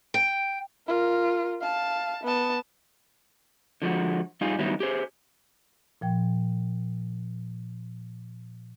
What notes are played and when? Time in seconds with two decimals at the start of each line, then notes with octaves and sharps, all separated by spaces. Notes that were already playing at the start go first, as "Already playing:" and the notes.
0.14 G5
0.88 F4 A#4
1.62 F5 A5
2.23 B3 A5
3.82 D3 F3 G#3 F#4
4.41 G2 G3 D#4 F4 G#4
4.59 D#3 F#3 G3 B3 D#4 E4
4.80 G4 G#4 C5
6.01 A#2 F3 G5